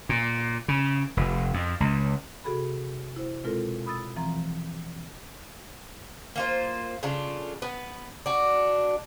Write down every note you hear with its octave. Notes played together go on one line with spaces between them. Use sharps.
A#2
C#3
F1
F2
C#2
C3 F#4 G#4 A4 B5
E4 C5
B2 G#3 C4 F4 A4 A#4
B5 D#6 E6 A6
E3 F3 C4 A#5
A#3 F4 C5
C#3 D4 F4 A4
B3 B4
D4 F#4